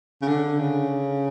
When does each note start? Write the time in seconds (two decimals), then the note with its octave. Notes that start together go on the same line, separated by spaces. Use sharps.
0.22 C#3
0.28 D3
0.60 C#3